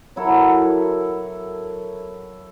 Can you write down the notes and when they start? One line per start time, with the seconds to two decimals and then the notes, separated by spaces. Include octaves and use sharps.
0.16 F#3 E4 A4 A#4